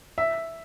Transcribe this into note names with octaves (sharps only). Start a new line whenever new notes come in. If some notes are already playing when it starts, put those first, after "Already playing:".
E5